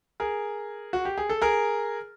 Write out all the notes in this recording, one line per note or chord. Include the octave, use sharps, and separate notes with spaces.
G#4 A#4
F#4
G4
G#4
A4
G#4 A#4